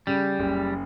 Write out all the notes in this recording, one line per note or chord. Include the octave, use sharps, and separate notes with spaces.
C#3 G3
F#1